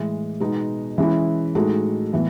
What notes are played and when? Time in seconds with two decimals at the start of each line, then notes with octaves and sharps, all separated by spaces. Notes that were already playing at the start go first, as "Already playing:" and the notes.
Already playing: A2 E3 G#3
0.40 B2 G#3 B3 D#4
0.98 E3 G#3 C#4 E4
1.55 A2 G#3 D#4 F#4 A4
2.13 A2 E3 B3